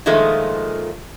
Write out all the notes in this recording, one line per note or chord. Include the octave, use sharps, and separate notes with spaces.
A#2 D#3 F3 G#3 A3